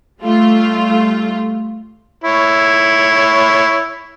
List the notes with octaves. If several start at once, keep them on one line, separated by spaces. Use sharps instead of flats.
G3 A3 F4
E4 C#5